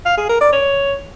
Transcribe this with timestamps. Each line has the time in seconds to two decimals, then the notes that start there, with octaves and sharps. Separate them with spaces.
0.06 F5
0.17 G#4
0.29 A#4
0.41 D5
0.52 C#5